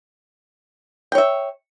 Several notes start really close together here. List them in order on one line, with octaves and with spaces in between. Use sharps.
G5 C#5 E5